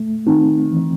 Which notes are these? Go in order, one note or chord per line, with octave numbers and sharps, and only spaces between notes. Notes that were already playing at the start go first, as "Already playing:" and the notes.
Already playing: A3
D#3 C4
E3